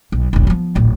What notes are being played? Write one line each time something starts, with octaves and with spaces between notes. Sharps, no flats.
B1
E1 B1
F3 B3
D1 A#1